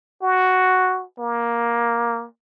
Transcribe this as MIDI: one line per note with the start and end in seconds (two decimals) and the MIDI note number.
0.23 1.04 66
1.19 2.26 58